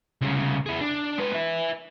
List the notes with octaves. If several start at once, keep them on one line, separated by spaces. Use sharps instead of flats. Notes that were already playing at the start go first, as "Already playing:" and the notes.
C2 C#3
E4 G#4
D4
G#3 B4
B4 E5